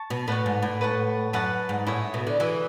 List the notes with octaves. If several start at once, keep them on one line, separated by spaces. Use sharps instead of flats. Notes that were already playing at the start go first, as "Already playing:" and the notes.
Already playing: A5 C#6
B2
A2 B4 F#5 A5 C#6
G#2
A2
B4 F#5 A5 C#6
F#2 B4 F#5 A5 C#6
G#2
A2 E4 G#4 C#5
B2
D3
E3 E4 G#4 C#5